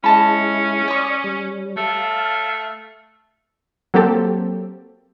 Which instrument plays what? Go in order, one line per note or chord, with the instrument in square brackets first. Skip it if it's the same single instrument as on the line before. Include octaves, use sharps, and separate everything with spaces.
[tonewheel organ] G#3 E4 [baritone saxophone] C#4 [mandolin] D#5 A5 B5
[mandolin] C#5 C#6 [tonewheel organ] D5 D#6
[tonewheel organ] G3
[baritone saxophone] A3 [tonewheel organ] F5 A5
[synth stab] F#3 A#3 C4 G4 A4